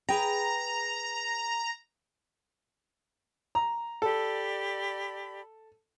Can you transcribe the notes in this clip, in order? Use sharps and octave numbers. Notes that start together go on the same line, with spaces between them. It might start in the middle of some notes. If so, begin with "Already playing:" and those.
G#4 B4 G5 A#5
A#5
G4 A4 D5 B5